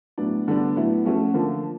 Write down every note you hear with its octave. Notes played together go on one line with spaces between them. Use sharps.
A2 F#3 B3 D4
D3 G3 B3 D4
A2 F#3 B3 E4
F3 A3 C#4 F#4 A4
D3 F3 A#3